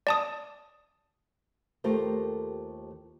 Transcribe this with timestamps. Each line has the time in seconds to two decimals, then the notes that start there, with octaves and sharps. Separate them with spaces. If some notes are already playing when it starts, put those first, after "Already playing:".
0.07 D5 A5 D#6
1.84 D#2 A3 F4 G4 A#4 C5